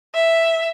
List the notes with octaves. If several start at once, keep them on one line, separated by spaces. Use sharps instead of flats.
E5